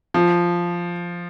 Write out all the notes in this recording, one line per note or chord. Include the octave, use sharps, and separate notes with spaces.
F3